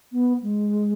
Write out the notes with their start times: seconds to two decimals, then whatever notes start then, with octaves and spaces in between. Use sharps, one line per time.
0.12 B3
0.43 G#3